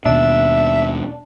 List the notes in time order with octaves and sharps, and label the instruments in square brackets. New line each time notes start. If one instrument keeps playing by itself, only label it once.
[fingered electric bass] D#2 B2 [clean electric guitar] D4 [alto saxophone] E5